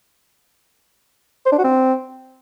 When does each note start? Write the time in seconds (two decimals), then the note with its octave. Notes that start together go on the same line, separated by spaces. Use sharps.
1.46 C5
1.52 D4
1.58 F#4
1.64 C4